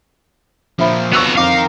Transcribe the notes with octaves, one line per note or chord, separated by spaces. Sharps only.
A#2 F3 C5 E5 B5
F2 B3 F#4 A#5 C#6 E6 F#6
F2 D#4 A#4 F5 D6